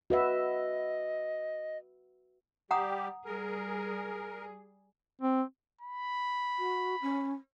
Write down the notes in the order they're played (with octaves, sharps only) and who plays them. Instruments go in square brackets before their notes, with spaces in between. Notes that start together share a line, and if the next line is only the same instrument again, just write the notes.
[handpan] F#4 B4 E5 [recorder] D#5
[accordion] G3 G4 [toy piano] F#5 A#5 D#6
[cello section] G3 G#4 [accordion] A#4
[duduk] C4
[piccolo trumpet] B5
[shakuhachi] F#4
C#4